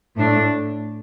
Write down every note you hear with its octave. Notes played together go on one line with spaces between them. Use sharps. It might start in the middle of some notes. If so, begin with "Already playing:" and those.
A2 A3 D4